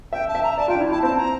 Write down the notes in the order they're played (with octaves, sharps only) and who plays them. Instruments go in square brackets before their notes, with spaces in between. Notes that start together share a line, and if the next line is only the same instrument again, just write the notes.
[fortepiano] E5 [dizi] G5
[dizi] A5
[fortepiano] E5
[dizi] A#5
[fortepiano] D5 [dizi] A5
[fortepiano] F4 [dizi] G5
[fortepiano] D4
E4
[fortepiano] E4 [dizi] A5
[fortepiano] C4 [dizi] A5
[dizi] A#5